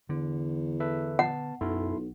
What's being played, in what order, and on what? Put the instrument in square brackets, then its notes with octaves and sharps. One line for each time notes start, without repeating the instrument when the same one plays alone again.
[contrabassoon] E2 [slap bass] D3
[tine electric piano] A4 B4 E5
[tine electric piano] B3 A5 [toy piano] F#5
[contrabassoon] B1 [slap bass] F#2 [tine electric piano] E4 A4 C6